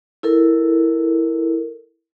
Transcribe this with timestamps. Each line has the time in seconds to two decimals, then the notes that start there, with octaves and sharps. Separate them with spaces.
0.23 E4 A4 A#4